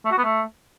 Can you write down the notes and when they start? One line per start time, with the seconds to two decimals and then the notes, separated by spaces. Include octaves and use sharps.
0.05 A3
0.11 F#4
0.18 B3
0.24 A3